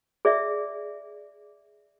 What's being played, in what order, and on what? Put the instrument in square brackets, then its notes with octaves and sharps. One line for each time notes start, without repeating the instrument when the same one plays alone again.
[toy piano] G#4 D5 E5